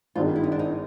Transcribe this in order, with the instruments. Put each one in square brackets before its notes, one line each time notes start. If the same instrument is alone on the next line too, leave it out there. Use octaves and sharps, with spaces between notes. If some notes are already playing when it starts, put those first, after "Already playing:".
[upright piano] G#1 G2 D#3 G#3 [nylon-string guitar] F4
[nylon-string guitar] E4
D#4
D4
D#4